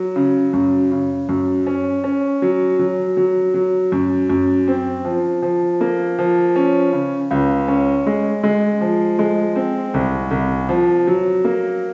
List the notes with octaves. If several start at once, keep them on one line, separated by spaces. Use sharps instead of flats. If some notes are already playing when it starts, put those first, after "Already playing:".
Already playing: F#3
C#3
F#2
C#3
F#2
C#4
C#4
F#3
F#3
F#3
F#3
F#2
F#2
C4
F3
F3
A#3
F3
C#4
C#3
C#2
C#4
G#3
G#3
F3
G#3
C4
C2
C2
F3
F#3
A#3